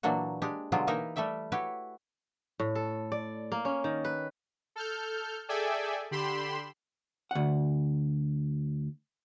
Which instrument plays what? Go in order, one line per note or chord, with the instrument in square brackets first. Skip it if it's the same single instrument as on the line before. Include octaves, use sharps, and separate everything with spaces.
[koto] A#2 E3 F#3 A#3 D4 F#4
G#3 D4 G4
B2 D3 F#3 G#3 F4 G4
E3 A#3 D#4 A#4 E5
G3 A3 G4 E5 G5
E4 F#4 G4 B4 C#5
[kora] A2
A4
D5
A#3
C#4
D#3
B4
[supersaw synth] A4 F6 G6
G#4 A4 D5 E5 G5 G#5
D3 G4 B5 C6 E7
[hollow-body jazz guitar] D2 F#5